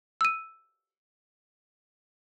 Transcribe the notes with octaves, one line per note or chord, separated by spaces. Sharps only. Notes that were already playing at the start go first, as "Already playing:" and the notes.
E6 D#7